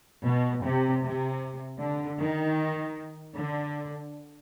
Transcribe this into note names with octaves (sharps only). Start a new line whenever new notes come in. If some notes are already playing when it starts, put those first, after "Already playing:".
B2
C3
C3
D3
D#3
D3